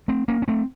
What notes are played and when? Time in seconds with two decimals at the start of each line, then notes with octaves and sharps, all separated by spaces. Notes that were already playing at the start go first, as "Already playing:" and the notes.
0.08 A3 C4
0.28 A#3 C#4
0.42 C#4
0.48 A3 C4